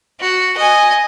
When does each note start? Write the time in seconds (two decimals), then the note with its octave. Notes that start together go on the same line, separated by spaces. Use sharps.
0.20 F#4
0.57 D#5 G#5